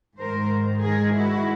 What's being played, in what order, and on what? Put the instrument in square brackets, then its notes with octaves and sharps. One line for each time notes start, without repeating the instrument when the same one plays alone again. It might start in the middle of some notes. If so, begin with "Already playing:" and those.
[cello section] G#2 D#3 G#3 A#4 C5
G#4 A#4
E4 F#4